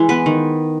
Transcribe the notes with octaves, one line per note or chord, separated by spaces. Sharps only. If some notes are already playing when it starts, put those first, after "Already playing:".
Already playing: E3 G#3
B3 B4
D#3